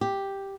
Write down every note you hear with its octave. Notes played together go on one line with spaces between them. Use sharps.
G4